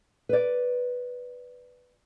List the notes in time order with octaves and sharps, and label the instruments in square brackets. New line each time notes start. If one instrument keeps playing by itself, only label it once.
[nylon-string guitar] B4 D5